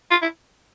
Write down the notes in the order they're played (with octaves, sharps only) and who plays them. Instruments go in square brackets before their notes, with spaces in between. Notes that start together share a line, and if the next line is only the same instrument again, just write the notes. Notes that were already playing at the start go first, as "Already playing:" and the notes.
[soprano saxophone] F4
E4